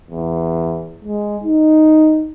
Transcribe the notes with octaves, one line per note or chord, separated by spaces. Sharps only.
E2
G#3
D#4